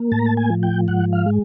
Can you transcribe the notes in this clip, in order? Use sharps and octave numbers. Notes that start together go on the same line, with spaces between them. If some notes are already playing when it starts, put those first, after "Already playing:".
Already playing: A#3
A2 A5
A#5
A5
G#5
F3
G5
G#2 F#5
F5
G#3